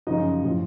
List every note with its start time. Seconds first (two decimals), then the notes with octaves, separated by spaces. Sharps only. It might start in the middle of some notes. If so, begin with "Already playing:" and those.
0.07 F#2 C#3 F3 D#4 D#5
0.43 A2 F3